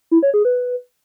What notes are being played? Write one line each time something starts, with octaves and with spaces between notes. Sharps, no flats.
E4
C#5
G#4
B4